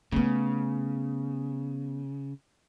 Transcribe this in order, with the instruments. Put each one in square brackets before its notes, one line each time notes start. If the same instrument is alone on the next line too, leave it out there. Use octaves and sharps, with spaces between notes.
[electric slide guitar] C#3 [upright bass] A3 B3